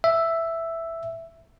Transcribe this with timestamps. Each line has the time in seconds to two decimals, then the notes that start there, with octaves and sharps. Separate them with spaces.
0.04 E5